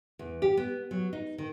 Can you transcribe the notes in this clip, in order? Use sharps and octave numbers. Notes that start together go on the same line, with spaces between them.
E2
G4
B3
F#3
D#4
D#3